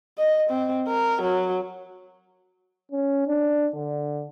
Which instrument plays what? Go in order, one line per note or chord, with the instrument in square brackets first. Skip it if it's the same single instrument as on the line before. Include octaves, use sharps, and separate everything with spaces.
[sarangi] D#5
C4
A#4
F#3
[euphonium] C#4
D4
D3